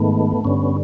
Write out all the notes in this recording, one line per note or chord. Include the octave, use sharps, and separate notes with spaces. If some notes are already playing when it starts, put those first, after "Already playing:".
Already playing: G#2 D#3 A3 B3
G2 D3 B3 C#4